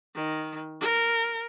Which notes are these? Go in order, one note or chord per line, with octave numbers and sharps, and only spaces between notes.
D#3
A#4